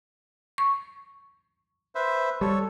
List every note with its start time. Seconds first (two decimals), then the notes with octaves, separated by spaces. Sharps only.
0.58 C#6
1.95 B4 C5 E5
2.41 G3 A4 C#5